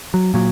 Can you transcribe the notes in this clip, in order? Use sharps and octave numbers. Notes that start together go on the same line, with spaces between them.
F#3
A#2 F#3